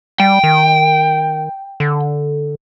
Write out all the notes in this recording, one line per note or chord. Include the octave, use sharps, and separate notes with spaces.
G3 G5
D#3
D3